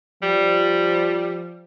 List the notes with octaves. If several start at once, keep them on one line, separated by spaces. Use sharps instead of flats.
F3 G3